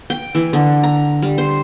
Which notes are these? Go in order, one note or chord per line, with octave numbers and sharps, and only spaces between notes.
G5
E3
D3
A#5
G3
C5